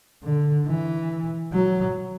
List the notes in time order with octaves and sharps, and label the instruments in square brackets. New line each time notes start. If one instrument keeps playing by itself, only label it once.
[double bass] D3
E3
F#3